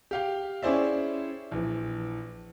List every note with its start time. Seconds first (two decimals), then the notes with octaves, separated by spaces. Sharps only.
0.11 G4 F5 G5
0.62 C#4 E4 G#4 C5 D5 E5
1.51 A#1 E3